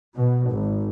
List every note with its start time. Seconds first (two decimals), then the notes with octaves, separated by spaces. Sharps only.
0.16 B2
0.49 G#1